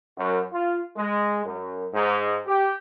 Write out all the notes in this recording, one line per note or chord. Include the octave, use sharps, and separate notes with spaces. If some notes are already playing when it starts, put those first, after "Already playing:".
F#2
F4
G#3
F#2
G#2
G4